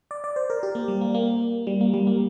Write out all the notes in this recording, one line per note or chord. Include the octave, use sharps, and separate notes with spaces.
D5
D5
C5
A#4
G4
A#3
G3
A#3
A#3
G3
A#3
G3
A#3